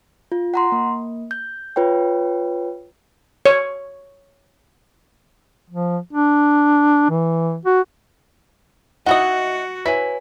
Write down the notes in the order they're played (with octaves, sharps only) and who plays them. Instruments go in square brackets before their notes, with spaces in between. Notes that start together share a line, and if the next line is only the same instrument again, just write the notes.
[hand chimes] F4
F#5 A#5 C6
A#3
G6
F4 B4 C#5 G5
[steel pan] C#5
[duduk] F3
D4
E3
F#4
[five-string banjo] D#4 E4 D#5 [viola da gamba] F#4 [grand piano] F#5
[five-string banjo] E4 [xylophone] B4 C#5 G#5 [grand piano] B6